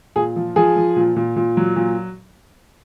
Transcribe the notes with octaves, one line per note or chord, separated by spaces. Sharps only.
A#2 G#4
F3
F3 G#4
F3
A#2
A#2
A#2
F#3
A#2